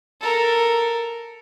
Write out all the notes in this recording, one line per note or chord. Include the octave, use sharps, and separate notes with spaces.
A4 A#4